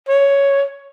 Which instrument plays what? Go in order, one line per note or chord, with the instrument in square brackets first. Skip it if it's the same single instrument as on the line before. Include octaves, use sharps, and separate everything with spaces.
[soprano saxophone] C#5